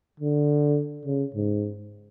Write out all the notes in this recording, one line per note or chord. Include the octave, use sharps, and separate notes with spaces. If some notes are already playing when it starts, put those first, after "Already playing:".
D3
C#3
G#2